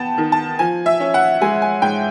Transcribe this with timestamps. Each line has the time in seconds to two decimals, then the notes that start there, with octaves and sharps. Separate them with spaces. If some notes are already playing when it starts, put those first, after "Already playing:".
Already playing: B3 G5 A5
0.18 D#3
0.32 A5
0.59 F3 G#5
0.86 E5
1.00 C#4
1.14 F#5
1.41 G#3 G#5
1.62 G#5
1.82 G#2 G5